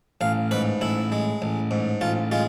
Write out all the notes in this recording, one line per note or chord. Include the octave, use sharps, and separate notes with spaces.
A1 F5
G#2 B4
A1 E4
G#3
A1
G#2
A1 F4
G#3 F4